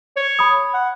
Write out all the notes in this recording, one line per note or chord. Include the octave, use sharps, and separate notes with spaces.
C#5
B5 D#6
F#5